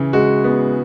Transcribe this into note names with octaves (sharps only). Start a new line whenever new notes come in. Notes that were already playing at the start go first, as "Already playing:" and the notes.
Already playing: C#3 E3
G#3 F#4
B3